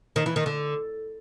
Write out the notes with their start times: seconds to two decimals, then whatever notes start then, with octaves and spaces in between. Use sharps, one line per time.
0.16 D#3
0.26 E3
0.36 D#3
0.46 D3